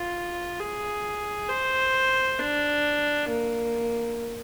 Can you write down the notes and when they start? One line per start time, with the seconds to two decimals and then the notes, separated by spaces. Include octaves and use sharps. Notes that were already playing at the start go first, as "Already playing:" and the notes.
Already playing: F4
0.60 G#4
1.49 C5
2.39 D4
3.28 A#3